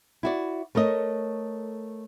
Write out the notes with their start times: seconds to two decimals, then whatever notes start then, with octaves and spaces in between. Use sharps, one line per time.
0.23 E4 F#4 D5
0.75 A3 A#4 C#5 D#5